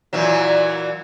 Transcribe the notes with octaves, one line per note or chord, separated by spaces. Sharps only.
A#2 E3 F#3